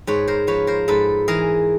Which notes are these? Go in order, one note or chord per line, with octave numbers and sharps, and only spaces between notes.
G#2 B4 C#5
A#4 C5
F3 B4 C#5
A#4 C5
G#2 A4 B4
E3 G#4 A#4